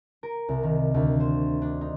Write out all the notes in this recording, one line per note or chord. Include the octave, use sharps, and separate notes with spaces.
A#4
C2
D#3
D2
C5
D4
D#4